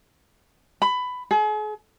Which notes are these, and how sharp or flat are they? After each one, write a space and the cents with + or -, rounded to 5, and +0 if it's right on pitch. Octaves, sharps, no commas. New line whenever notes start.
B5 +15
G#4 +40